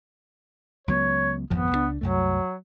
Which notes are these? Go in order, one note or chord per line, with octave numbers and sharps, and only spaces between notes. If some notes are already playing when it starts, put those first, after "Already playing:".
C#2 F#3 B3 C#5
G#1 F2 F3 B3
C#2 G3 D4
C2 F#2 F#3 A3